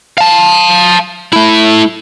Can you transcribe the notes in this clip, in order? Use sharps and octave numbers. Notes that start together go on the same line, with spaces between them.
F5 A5
A3 E4